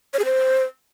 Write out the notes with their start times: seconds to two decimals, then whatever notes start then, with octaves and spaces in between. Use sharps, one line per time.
0.13 C#5
0.19 G#4
0.25 C5